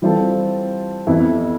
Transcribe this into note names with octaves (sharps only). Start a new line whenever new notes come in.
E3 G3 C4 F4 A4
F2 E3 B3 E4